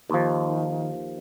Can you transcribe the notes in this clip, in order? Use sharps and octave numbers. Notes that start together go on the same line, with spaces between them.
D#2 D#3 F3